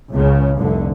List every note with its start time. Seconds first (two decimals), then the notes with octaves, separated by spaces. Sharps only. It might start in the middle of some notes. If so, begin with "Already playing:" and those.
0.11 C#2 C#3
0.58 F1 C2 D3